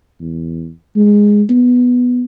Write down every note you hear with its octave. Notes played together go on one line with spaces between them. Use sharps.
E2
G#3
B3